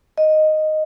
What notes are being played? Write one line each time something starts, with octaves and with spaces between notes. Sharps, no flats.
D#5